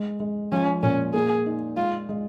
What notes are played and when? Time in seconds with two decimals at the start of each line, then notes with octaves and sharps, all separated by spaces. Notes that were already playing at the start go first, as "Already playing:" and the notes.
Already playing: G#3
0.20 G#3
0.52 F3 C#4
0.83 A#2 C#4
1.14 A#3 G#4
1.46 D#4
1.76 G#3 F4
2.09 G#3